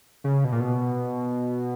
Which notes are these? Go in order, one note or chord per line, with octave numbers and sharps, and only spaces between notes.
C#3
B2
A#2
B2